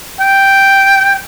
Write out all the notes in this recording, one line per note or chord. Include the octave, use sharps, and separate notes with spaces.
G5